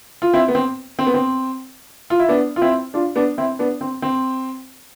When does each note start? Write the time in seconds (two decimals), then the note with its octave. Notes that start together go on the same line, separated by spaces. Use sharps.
0.22 F4
0.34 C4 E4
0.48 B3
0.55 C4
0.99 C4
1.06 B3
1.14 C4
2.10 F4
2.19 E4
2.28 B3 D4
2.56 F4
2.61 C4 E4
2.94 D4 F4
3.16 B3 D4
3.38 C4 E4
3.59 B3 D4
3.81 C4
4.02 C4